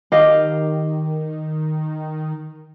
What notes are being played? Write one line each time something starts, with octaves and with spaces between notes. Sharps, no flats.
D#3 G4 D#5 F5